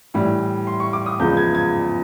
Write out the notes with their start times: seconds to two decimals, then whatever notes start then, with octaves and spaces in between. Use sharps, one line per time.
0.14 A2 E3 G3
0.67 C6
0.80 C#6
0.93 D6
1.06 D#6
1.19 E2 C#3 F3 G#3 B3 G6
1.37 G#6
1.55 G#6